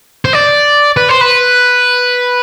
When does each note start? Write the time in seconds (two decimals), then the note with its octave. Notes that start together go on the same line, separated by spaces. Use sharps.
0.25 C5
0.33 D5
0.97 B4
1.09 C5
1.21 B4